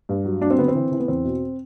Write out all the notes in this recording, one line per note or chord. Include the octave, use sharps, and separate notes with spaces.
G2
F#3
F#3 D4
C4
D3 B3
C4
E3
E3
B3
E2 C4
B2